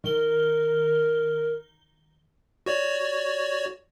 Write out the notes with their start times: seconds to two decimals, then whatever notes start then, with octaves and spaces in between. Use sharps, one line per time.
0.04 D#3 A#4 G7
2.66 F#4 C#5 D5